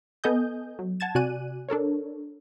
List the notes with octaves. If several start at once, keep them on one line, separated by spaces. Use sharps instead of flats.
B3 A4 D#5 G#5 D#6 G6
F#3
F#5 A5 G#6 A6 E7
C3 F#4 D5 G#5 F#6 D#7
D4 A4 A#4 C#5